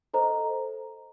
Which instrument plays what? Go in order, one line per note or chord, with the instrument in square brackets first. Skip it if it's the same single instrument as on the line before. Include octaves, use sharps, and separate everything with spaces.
[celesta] A4 C5 D#5 A#5